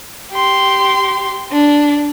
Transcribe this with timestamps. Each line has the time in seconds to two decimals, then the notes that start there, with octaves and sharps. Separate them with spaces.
0.32 G4 C6
1.52 D4